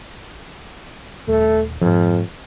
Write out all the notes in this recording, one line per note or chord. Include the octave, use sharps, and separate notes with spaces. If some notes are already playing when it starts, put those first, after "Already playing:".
D#1 A3
F2 G#2 F3